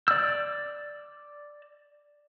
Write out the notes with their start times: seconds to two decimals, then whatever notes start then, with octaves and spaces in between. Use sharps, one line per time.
0.08 D5 E6